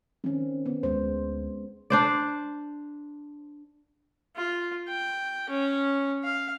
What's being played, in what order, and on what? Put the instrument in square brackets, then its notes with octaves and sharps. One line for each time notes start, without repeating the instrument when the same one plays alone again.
[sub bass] D#3 [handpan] C4 C#4
[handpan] B3
[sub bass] D2 [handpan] G#3 C5
[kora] D4 C5 D5
[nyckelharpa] F4
G5
C#4
F5